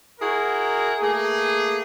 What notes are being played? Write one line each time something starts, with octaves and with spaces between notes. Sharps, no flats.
E4 F#4 G#4 A#4
A3 A#3 G#4